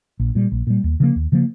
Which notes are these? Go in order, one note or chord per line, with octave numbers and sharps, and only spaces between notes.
A#1
A#2 G3
A#1
A#2 G3
D#2
C#3 F3 A#3
D#2
C#3 F3 A#3